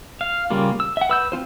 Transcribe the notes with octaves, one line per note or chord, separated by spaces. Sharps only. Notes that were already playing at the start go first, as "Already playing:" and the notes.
F5
C#3 G3 A#3 F4
E6
E5 F#5
B4 E6 G6
C4 C#4 F4 C5